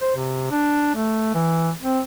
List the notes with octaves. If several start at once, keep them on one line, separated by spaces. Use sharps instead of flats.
C5
C3
D4
A3
E3
C4